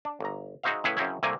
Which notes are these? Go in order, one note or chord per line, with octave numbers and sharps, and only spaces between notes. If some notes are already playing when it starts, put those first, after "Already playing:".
D4
G1 A#5
G#3 D#4 F#4 C5 E5 F5
A2 C#3 E4 G#4 B4 C#5
F#2 C#3 C4 C#4 E4
C2 C3 A3 A#3 G#5